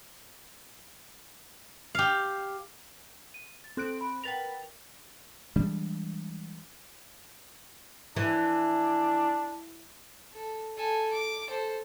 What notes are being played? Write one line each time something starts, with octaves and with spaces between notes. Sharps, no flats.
G4 F5
D#7
A6
C4 A4 F#6 D7
B5
A#4 B4 F#5 G5 A6 F7
E3 G3 G#3 D4
E3 D4
A4
A4 G#5
D6
A4 C5